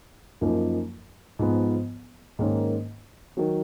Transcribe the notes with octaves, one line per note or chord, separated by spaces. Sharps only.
F#2 F3 A#3 D#4
G#2 F3 B3
G#2 D#3 A#3 C#4
D#3 F#3